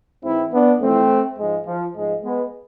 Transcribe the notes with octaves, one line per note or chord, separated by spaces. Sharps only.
G#2 E3 C4 E4
B3 D4
F2 E3 A3 C4
G#2 F3 G#3
F3
G#2 F3 G#3
G#3 B3